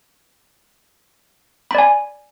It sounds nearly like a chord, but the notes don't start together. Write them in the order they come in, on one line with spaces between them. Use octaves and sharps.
B5 D5 G#5